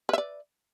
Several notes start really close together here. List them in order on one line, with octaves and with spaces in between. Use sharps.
B4 E5 D5